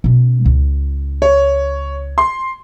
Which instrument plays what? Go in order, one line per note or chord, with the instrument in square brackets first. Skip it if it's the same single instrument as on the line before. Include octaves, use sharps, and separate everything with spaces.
[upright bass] B2 C#4
C#2
[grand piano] C#5
C6